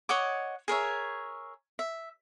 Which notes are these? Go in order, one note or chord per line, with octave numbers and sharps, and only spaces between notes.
C#5 D#5 F#5 D6
G#4 A#4 C#5 E5
E5